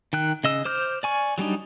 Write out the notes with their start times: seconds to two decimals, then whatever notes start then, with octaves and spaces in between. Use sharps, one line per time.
0.13 D#3 G5 F#6
0.44 C#3 D#5 E6
0.65 C5 D6 F6 G6
1.03 D5 G#5 C#6
1.38 F#3 G3 D4 D#4